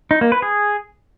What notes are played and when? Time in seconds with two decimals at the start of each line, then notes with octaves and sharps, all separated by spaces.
0.11 D#4
0.21 A#3
0.32 B4
0.42 G#4